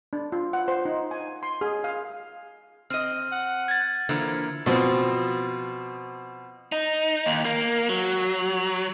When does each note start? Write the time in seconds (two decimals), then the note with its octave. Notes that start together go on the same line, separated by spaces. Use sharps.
0.13 D4
0.32 F4
0.53 F#5
0.68 C5
0.85 D#4
1.11 G#5
1.43 C6
1.61 G#4
1.84 F5
2.90 C4 D#5 F6 D#7
3.32 F#5
3.68 G#6 A6
4.09 D3 E3 F3 A#3 E6
4.66 B2 F3 C4
6.72 D#4
7.26 D#2
7.45 A#3
7.89 F#3